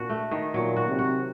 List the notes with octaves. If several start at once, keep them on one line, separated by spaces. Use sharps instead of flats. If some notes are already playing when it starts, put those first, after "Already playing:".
Already playing: A#2 D4 F#4
A3
D#3
A#2 F#3
F#4
C3
F#4